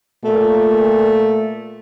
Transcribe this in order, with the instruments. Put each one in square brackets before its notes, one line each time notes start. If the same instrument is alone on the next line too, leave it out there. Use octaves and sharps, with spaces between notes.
[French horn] A#2 [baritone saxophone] A3